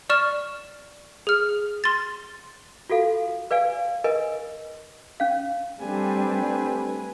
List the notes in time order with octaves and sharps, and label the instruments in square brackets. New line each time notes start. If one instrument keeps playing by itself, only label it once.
[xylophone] D5 C#6 F6 E7
G#4 F6
C6 A6
[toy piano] F4 F#4 A4 F5
B4 D5 F5 G#5
A#4 B4 D#5 G#5
C#4 F5
[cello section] G3 D4 [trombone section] A3 C4 G4 [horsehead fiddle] B4 G#5